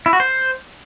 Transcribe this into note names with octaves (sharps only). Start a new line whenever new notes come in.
E4
F#4
C5